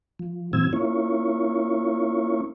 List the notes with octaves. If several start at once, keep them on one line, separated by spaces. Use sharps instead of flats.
F3
A#2 E3 F#3 C4 E6 G#6
A#3 C#4 E4 F4 C#5